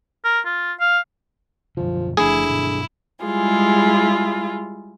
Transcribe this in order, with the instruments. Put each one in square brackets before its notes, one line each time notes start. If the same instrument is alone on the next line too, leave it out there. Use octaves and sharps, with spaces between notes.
[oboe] A#4
F4
F5
[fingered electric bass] F#2 B2 D3 [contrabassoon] F3
[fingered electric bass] F#1 F3 A3 [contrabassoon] D3 [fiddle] E4 [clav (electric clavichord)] G#4
[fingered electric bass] G2 B2 F#3
[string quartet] G3 G#3 E4 F4 G#4